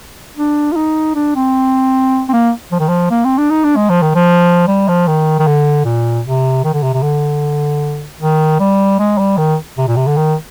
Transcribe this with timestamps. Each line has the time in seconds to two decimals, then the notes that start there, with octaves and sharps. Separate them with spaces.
0.37 D4
0.72 F4
0.76 D#4
1.15 D4
1.36 C4
2.29 C4
2.33 A#3
2.72 F3
2.80 D#3
2.88 F3
3.11 A#3
3.25 C4
3.38 D4
3.50 D#4
3.64 D4
3.76 G#3
3.89 F3
4.02 D#3
4.15 F3
4.68 G3
4.88 F3
5.08 D#3
5.39 D#3
5.47 D3
5.85 A#2
6.25 C3
6.64 D#3
6.73 D3
6.83 C3
6.94 C3
7.02 D3
8.20 D#3
8.59 G3
8.99 G#3
9.18 G3
9.37 D#3
9.78 C3
9.88 A#2
9.96 C3
10.07 D3
10.17 D#3